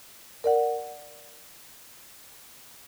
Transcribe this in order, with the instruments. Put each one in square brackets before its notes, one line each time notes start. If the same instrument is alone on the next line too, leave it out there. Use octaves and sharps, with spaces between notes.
[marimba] A#4 D5 F#5